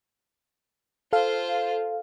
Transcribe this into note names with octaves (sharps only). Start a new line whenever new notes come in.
F4 A4 C5 F5